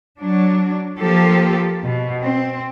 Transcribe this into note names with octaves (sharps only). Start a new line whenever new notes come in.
F#3 D4
F3 A#3 G4 A4
B2
C4